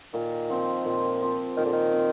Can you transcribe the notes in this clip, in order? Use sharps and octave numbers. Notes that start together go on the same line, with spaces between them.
A#2 D#3
F3 C4
A#2
F3 C4
A#2 D#3
D3
D#3
C4